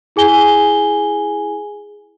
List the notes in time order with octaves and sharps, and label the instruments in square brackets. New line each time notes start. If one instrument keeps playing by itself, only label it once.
[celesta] E4 G#4 G#5 G7